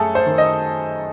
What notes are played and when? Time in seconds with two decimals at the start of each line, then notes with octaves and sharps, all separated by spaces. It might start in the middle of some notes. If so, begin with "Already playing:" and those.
Already playing: F#2 A3 G#4 A4
0.15 C5
0.26 D#3
0.38 D#5